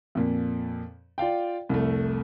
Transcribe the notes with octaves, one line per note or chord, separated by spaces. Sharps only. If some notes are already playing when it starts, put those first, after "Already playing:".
F2 A#2
F4 D5 F5 G5
C2 F2 A3